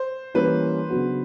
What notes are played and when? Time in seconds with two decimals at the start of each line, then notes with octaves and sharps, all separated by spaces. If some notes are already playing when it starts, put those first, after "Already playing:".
Already playing: C5
0.34 E3 G3 A#3 C#4 E4 B4
0.90 C#3 F#3 B3 D4 F#4